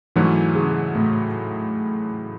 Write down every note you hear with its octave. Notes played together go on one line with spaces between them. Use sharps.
G#2 E3 F#3 A3 C#4
C#3
A2